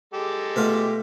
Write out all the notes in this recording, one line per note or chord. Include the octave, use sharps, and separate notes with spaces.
G#3 G4 A4
B2 A3 F4